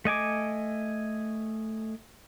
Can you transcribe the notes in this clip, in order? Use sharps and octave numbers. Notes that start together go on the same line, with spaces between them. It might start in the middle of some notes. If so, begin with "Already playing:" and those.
A3 D#5 G#5 D6